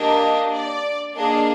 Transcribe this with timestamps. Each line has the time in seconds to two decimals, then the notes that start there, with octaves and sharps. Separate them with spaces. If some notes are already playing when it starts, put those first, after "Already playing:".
Already playing: A#3 D4 G4 D#5
0.53 D5
1.15 A#3 D4 G#4 D#5